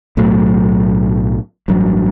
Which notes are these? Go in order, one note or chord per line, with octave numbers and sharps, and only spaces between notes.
B1 A2 F#3 A3
A1 G2 F#3